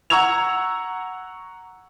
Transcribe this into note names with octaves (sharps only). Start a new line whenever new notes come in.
F#5 A#5 C#6 E6 G#6 F7